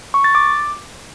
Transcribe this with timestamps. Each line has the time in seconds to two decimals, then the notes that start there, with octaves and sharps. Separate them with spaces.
0.14 C#6
0.24 A6
0.35 D6